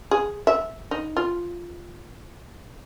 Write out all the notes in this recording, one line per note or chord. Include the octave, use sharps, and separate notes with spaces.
G#4
E5
D#4
F4